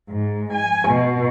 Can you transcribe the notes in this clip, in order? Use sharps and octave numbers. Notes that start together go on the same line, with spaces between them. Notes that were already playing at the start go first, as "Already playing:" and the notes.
G#2
G#5
B2